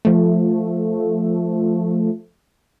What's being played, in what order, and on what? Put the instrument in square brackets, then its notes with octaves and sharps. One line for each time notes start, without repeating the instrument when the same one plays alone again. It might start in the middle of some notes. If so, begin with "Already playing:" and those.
[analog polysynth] F3 A3